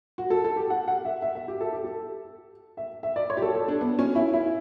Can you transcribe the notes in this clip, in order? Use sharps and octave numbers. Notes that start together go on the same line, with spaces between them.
F#4
A4
A4
G4
F#5
F#5
E5
E5
E5
G4
A4
G4
A4
E5
E5
D5
C#5
G4
A4
A4
D4
B3
C#4
E4
E4